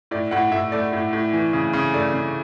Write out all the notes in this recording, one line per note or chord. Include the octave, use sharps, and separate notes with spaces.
A2 D5
A2 F#5
A2 E5
A3 D5
A2
A2
E3
C#3
C#3
A3 D5
C#3